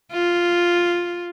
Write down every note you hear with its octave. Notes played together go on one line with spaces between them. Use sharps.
F4